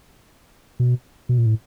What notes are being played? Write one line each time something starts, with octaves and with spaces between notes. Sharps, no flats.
B2
B2
A#2
A2